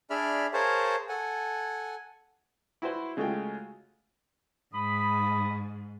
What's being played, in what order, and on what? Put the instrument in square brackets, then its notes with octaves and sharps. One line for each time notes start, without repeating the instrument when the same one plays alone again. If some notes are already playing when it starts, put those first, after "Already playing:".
[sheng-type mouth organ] D4 G#4 D5 E5 B5 F6
G#4 A#4 C5 C#5 F5 A5
A4 F#5 G#5
[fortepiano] E4 F#4 B4 C5
C#3 G#3 A3 F4 F#4 G5
[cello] G#2 [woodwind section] B5 D#6